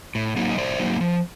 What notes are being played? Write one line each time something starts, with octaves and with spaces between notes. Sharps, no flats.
A2
F#3 A#3 D#4
D#5
A2 C5 D5
F#3 A#3 D#4
F3